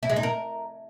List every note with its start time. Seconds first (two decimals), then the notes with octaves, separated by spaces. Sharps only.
0.03 E4
0.10 G#3
0.16 D#4
0.23 A#4